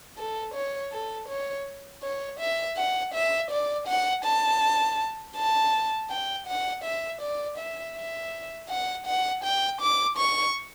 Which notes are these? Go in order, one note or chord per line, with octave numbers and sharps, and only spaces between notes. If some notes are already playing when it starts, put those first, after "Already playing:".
A4
C#5
A4
C#5
C#5
E5
F#5
E5
D5
F#5
A5
A5
G5
F#5
E5
D5
E5
E5
F#5
F#5
G5
D6
C#6